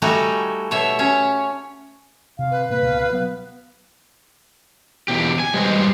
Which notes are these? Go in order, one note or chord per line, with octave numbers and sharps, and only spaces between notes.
G3 A3 D#4 F#4 G#5
B2 C#5 E5
C#4 C#5
C3 F5
B4
A2 A#3 B4
C#2 B2 F5
F5
F#3 B3
E2 B2 G4
G#5
G3 G#3 B4 C5 D#5